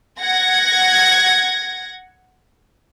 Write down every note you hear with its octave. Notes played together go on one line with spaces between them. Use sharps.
F#5 G#6 A#6